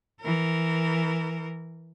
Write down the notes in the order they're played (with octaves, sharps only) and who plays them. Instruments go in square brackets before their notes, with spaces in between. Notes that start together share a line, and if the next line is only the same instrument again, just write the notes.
[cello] E3 A#4